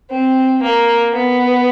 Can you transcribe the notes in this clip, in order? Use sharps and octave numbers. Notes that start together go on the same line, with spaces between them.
C4
A#3
B3